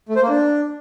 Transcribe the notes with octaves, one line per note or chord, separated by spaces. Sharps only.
A3
C5
A#3
D4